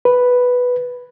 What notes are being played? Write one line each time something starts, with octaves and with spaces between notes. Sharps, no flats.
B4